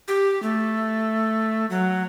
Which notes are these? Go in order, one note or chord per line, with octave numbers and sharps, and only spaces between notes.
G4
A3
F#3